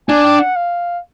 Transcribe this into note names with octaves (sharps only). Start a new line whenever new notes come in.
D4 G#5
G5
F#5
F5